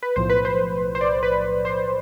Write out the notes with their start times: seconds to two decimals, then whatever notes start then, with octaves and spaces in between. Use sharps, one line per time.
0.03 B4
0.16 B1 A2 F3 C5
0.29 B4
0.45 C5
0.95 C5
1.01 D5
1.23 B4
1.65 C5